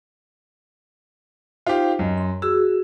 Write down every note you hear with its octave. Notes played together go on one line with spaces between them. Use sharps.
D#4 F4 G4 C5
F#2 D#5
C6
F#4 G#4 E6